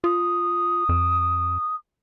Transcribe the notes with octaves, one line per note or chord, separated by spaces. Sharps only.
F4 D#6
F2